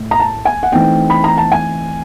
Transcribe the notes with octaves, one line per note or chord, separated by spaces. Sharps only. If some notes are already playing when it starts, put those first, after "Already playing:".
Already playing: A2
A#5
A5
G#5
F#5
E3 A3 C4 D#4 G5
B5
A#5
A5
G#5